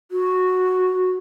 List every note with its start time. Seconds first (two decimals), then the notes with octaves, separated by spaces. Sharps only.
0.11 F#4